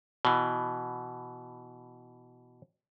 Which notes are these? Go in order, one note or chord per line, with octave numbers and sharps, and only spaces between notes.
B2 E3